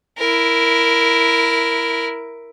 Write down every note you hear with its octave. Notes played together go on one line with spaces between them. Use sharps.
E4 A#4